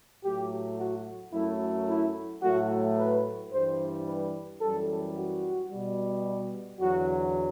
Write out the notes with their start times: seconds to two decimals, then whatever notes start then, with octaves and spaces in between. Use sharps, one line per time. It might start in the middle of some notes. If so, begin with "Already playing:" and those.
0.24 A2 F#3 A3 G4
0.78 F#4
1.33 F#2 F#3 A3 E4
1.88 E4
2.42 A2 F#3 A3 F#4
2.97 B4
3.51 G2 E3 G3 C5
4.06 B4
4.61 F#2 E3 G3 A4
5.15 F#4
5.71 B2 G3
6.80 E2 D3 F#3 F#4